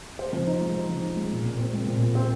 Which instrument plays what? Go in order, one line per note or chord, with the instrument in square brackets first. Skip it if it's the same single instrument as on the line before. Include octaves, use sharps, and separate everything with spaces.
[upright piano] C5
F3
D#4
G#3
C5
F3
D#4
G#3
A#2
A#2
C4
G#3
A#2
A#2
C4